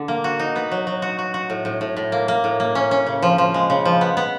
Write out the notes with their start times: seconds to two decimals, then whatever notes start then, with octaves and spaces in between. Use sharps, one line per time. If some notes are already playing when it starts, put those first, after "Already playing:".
Already playing: D3
0.08 A#3
0.24 F#4
0.39 D#4
0.56 B3
0.72 F#3
0.87 F#3
1.02 F#4
1.19 F#4
1.34 F#4
1.50 A2
1.65 A2
1.81 A2
1.97 A2
2.12 A#3
2.28 A#3
2.44 A2
2.60 A#3
2.75 C#4
2.91 C#4
3.06 C#3
3.22 F3
3.38 F3
3.54 G#3
3.70 C#3
3.85 F3
4.01 B3
4.17 B3